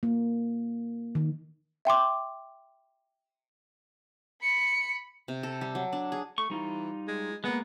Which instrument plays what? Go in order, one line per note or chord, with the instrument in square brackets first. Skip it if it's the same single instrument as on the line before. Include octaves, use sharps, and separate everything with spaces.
[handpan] A#3
D#3
[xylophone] E5 G5 C6 D6
[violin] B5 C#7
[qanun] C3
A4
G3
F#3
D4
G#4
[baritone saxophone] A3 [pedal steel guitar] C#6
[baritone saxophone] E3 [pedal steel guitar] G3 D#4 F4
[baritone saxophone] G#3
[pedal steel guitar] G#3 A#3 [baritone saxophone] B3